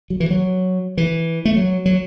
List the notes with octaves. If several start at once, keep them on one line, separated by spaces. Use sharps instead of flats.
F#3
E3
F#3
E3
A3
F#3
F#3